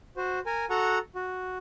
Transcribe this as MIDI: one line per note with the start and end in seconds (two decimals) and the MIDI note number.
0.17 0.40 66
0.17 0.40 72
0.46 0.65 70
0.46 0.65 80
0.70 0.98 66
0.70 0.98 69
0.70 0.98 78
0.70 0.98 82
0.70 0.98 85
1.15 1.58 66